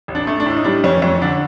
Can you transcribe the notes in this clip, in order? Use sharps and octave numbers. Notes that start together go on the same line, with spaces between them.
A1
D4
A3
D4
A2
D#4
G3 D4
F2 C#4
F2 C#4
D3 D4